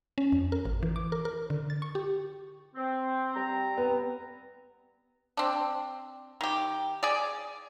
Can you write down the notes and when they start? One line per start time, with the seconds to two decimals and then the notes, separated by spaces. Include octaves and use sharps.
0.18 C#4
0.32 F2
0.52 A#4
0.65 A1
0.83 E3
0.96 D6
1.12 A#4
1.25 A#4
1.50 D3
1.70 A6
1.82 C#6
1.95 G4
2.75 C4
3.35 G3 C4 A#5
3.77 B3
5.37 C4 D4
6.41 D#3 G4
7.03 G#4 D5